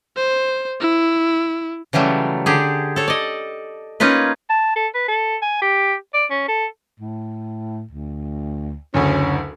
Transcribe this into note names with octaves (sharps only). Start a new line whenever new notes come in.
C5
E4
C#3 E3 F#3 G3 A3
D3 G4 G#4
A4 C#5
D5 D#5
A#3 C#4 D#4 F4 B4
A5
A4
B4
A4
G#5
G4
D5
C#4
A4
A2
D2
F#1 D2 C#4